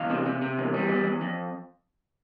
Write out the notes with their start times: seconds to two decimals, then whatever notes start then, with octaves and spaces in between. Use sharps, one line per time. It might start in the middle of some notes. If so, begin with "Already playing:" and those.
Already playing: E2 F5
0.10 C3
0.26 C3
0.42 C3
0.58 E2
0.74 G3
0.90 E2
1.05 E2
1.22 F2